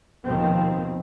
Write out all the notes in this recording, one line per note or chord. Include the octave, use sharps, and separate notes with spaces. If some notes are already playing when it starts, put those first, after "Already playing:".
D#2 B2 D#3 F3 C4